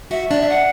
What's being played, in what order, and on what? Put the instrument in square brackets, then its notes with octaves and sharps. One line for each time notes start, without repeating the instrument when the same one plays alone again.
[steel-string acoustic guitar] F#4 [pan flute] E5
[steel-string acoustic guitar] D4 [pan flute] D5
[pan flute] E5
F#5